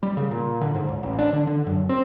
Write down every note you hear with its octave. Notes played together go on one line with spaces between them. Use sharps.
G3
C#3
A#2
D3
G#2
C#2
A1
D4
D3
D3
F#2
C4